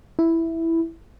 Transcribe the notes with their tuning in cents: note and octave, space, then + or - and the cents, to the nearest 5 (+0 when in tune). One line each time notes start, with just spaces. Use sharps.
E4 +0